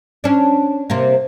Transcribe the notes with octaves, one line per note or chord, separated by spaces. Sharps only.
C#4 D4
C3 A#3